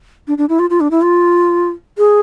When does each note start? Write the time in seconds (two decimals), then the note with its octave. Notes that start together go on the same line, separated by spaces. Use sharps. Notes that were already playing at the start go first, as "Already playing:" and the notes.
0.28 D4
0.38 D4
0.49 E4
0.59 F4
0.70 F4
0.81 D4
0.91 E4
1.02 F4
1.98 G#4